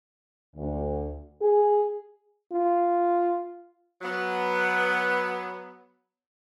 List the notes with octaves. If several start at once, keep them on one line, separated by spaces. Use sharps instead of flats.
D2
G#4
F4
F#3 B3